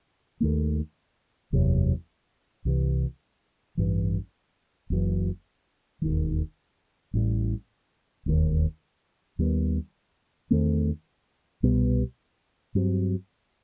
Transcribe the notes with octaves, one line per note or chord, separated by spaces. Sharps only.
D#2 D#3 A3
F#1 E2 C3 F#3
C2 C3 E3
A1 G2 E3
F#1 F#2 E3
E1 D#2 D#3
A1 A2 G3
E1 D#2 D#3
D#2 D#3 G3 B3
E2 D#3 A3 C4
C2 B2 G3 B3
G2 F#3 C4